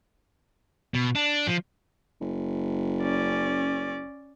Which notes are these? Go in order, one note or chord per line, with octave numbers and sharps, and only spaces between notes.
B2
D4
F3
F#1
C#4 D5